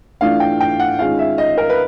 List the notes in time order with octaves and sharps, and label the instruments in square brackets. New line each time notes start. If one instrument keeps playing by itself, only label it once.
[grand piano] E3 A3 D4 F4 F5
G5
G5
F#5
D#3 G#3 C#4 F4 F5
E5
D#5
A#4
B4